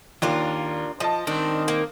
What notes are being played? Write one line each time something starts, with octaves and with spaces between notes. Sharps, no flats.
D#2 D4 F4 A#4
F3 D#5 A5
D#3 C4 D4
A#3